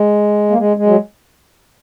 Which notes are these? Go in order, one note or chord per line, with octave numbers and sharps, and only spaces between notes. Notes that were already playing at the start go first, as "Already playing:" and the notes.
Already playing: G#3
A#3
G#3
G#3
F#3